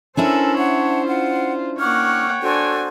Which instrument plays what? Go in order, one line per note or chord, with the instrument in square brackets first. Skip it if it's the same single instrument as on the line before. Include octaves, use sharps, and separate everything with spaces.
[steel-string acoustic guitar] C#4 D4 E4 [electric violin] A4 [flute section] A#4 G#5 [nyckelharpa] C5
[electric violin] C#5 [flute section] E5 F#5 A5
[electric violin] F4 [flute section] F#5
[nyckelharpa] A#3 F#5 [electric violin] C#5 G5 [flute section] C#6 D6 F6
[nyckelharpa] D4 G#5 [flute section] F#4 A4 C5